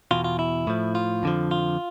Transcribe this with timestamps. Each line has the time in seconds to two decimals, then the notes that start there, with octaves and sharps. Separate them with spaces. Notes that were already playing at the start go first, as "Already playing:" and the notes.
0.11 E2 B2 F4
0.24 F4
0.39 E4
0.67 A2 F3
0.95 F4
1.23 F2 D3 F3
1.51 F4